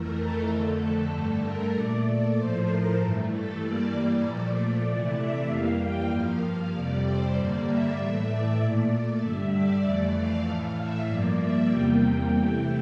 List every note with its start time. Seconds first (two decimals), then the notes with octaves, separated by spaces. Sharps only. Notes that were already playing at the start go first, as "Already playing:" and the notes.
Already playing: F2 E3 A3 A#4
0.19 A4
0.50 F2 D3 A3 A4
0.81 A4
1.12 G2 D3 A3 A4
1.43 A#4
1.75 A#2 A3 D5
2.37 A2 F3 A3 C5
2.68 A#4
2.99 G2 E3 A3
3.30 A4
3.61 G2 E3 G3 A#3 D5
4.23 A#2 F3 A3 D5
4.86 C3 E3 A3
5.17 E5
5.47 F2 E3 G3 A#3 F5
5.79 G5
6.10 G2 F3 A#3 F5
6.72 F2 C3 G3 D5
7.04 C5
7.34 G2 D3 G3 A#3 D5
7.66 E5
7.97 A2 E3 A3 E5
8.28 D5
8.59 A#2 A3
8.90 D5
9.21 G2 D3 G3 E5
9.52 D5
9.83 F2 E3 A3
10.14 F5
10.46 A2 E3 A3 F5
10.77 E5
11.07 G2 F3 A#3 D5
11.39 E5
11.70 E2 C3 G3 A#3 G5
12.01 G5
12.32 C3 E3 A3